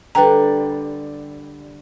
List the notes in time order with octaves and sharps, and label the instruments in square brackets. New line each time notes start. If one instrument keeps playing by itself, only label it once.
[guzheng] D3 G3 [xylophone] B4 G5 A#5